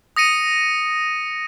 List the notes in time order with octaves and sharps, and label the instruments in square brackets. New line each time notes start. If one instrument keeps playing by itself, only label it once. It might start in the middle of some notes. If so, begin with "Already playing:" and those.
[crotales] D#6 A#6 C#7 D#7